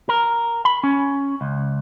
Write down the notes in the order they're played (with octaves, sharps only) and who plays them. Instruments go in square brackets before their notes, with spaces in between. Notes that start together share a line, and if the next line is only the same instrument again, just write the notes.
[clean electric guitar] A#4
B5
C#4
C#2